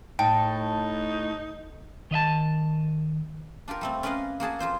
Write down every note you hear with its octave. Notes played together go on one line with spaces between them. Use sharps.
A2 D#4 G5 A5
D#3 D#5 E5 A5
D4 F4 G4 A#4
G3 A3 C4
C#4 A#4 B4 D5 D#5 F5
A#3 F#4 G#4 A5
F2 F4 C5 F5